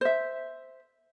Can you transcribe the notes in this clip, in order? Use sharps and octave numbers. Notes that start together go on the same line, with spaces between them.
C5 E5